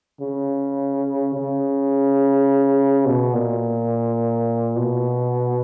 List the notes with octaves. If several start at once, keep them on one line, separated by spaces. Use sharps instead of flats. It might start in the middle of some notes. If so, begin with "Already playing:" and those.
C#3
C#3
B2
A#2
B2